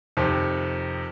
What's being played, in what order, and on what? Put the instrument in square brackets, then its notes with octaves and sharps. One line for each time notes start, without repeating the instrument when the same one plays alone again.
[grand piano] F2 C3 D#3